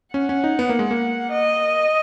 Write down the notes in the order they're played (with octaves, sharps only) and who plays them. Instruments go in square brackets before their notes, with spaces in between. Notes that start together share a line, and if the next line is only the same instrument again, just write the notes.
[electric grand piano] C#4 [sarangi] F#5
[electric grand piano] C#4
D#4
B3
A#3
G#3
A#3
[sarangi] D#5